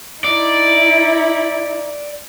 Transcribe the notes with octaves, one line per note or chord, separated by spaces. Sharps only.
D#4 E4 D5